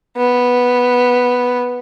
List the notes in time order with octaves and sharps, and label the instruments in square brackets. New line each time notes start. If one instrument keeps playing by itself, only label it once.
[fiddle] B3